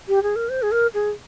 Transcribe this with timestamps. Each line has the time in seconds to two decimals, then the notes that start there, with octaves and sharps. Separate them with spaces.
0.08 G4
0.23 G#4
0.36 A#4
0.49 C5
0.62 G#4
0.72 A#4
0.94 G#4